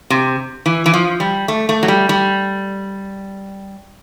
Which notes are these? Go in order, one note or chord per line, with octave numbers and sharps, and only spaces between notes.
C3
E3
E3
F3
G3
A3
A3
F#3
G3
G3